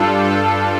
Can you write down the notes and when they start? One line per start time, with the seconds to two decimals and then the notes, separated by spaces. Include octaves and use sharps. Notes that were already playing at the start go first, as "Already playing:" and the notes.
Already playing: G2 G3 D4 F4 A4
0.24 A4